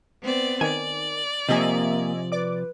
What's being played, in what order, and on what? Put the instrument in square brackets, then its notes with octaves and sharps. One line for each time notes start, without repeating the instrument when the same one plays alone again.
[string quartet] B3 C4 D5
[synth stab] D#3 [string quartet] D5 [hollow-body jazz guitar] G#5
[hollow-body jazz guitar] C3 F3 [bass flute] A#3 [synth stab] D#5 E5 G#5
[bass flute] B4 [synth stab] D5 D6